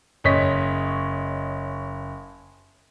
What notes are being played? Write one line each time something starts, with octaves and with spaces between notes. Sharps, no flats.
F#1 C#5 D#5 B6